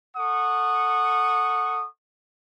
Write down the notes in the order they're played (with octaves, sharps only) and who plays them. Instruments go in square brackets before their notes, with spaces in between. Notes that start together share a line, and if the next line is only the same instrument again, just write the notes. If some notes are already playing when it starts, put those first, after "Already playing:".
[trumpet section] A4 F#5 C#6 D#6